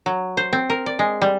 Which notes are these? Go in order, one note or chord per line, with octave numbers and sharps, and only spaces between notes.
F#3
C5
C4
A#4
D5
G#3
G3